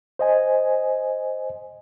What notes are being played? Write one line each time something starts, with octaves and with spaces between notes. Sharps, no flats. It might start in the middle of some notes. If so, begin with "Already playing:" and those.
C5 D#5 G#5